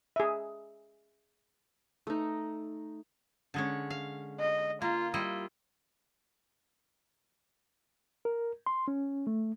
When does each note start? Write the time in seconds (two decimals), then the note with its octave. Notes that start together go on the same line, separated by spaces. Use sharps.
0.16 G#4 E5
2.07 A3 D#4
3.54 D3 G#3 C#4
3.90 F5
4.40 D#5
4.82 A#3 F4
5.14 G3 E4 F4 D#5
8.25 A#4
8.66 C6
8.88 C#4
9.27 A3